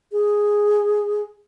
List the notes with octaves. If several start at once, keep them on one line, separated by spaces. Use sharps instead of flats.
G#4